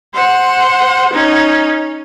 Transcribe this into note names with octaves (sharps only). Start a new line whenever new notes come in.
C5 F#5
C#4 D#4